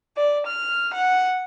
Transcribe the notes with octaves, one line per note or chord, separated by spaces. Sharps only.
D5
F6
F#5